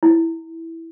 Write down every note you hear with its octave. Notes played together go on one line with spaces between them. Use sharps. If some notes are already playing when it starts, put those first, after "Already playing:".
E4